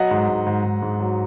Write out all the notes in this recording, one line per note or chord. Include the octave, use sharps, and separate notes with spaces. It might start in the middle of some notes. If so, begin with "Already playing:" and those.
Already playing: F#3 D#5 F#5
G#2
G#2
G#2
G#2
G#2
F#3